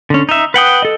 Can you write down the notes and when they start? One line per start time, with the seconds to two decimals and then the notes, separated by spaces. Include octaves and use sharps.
0.10 D3 C#4
0.29 D#4 E5
0.54 B4 F#5 G5 D#6
0.82 A4 D#5